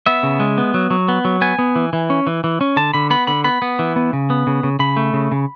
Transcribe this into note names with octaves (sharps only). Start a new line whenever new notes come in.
B3 E5
C#3
G#3
B3
F#3
F#3
B3
F#3
B3 G#5
B3
E3
E3
C#4
E3
E3
C#4
D3 A5
D3 B5
B3 B5
D3 B5
B3 B5
B3
E3
B3
C#3
B3
C#3
C#3
C#3 B5
A3
C#3
C#3